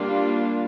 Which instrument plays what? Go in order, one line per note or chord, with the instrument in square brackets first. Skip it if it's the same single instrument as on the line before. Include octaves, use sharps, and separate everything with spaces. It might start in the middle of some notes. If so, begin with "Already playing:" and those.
Already playing: [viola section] G3 A#3 D4 F4